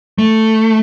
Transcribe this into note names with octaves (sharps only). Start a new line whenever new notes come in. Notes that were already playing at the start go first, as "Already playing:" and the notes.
A3